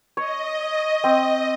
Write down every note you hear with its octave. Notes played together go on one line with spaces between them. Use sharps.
C#5 D#5
C4